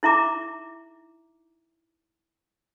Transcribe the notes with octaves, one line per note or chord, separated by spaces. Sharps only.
D#4 E4 E5 A#5 D6